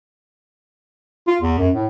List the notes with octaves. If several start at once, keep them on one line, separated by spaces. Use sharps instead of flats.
F4
E2
F#2
A2